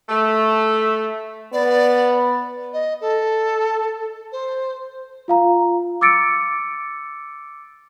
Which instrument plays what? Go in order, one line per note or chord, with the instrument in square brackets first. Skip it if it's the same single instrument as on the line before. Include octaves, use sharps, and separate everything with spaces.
[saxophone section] A3
[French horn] B3 [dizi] D5
[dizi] D#5
A4
C5
[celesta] F4 F5 A#5
D6 E6 A6 C#7 D7